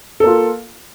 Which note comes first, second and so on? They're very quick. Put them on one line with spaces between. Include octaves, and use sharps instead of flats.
A4 A#3 F4